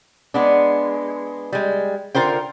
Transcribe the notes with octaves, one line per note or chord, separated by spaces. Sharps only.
G#3 B3 D4
G3 G#3
D3 F4 A#4 C5 G5